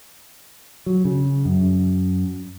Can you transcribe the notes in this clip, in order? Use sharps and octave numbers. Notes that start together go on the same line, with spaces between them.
F#3
C#3
F#2